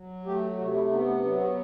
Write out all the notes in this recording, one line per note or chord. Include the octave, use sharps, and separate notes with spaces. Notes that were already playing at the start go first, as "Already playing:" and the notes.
Already playing: F#3
A3 G4
C3 F#4
E4
B3 D#4
D4
F#3 D4
F#4